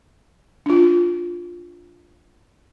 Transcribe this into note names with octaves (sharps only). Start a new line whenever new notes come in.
D4 F4